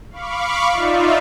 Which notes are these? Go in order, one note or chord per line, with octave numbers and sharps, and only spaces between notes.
F5 B5 C#6 D6
D#4 F4 D5 E5